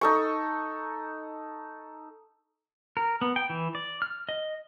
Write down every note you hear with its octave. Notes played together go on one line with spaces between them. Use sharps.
D#4 A4 C#6
A#4
B3
G5
E3
D5
F6
D#5